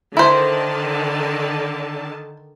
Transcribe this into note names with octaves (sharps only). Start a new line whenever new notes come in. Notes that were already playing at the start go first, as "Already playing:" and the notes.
D3 D#3 E4 C5 A5